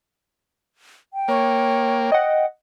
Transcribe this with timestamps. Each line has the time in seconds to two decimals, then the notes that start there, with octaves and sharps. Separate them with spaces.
1.14 G5
1.28 A#3 C#5
2.12 D#5 F#5